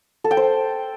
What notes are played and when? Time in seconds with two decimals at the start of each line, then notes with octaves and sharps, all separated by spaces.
0.24 A4
0.31 G5
0.37 C5